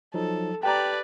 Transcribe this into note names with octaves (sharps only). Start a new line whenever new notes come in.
F3 F#3 D#4 A4
G4 B4 D5 G5 A5 A#5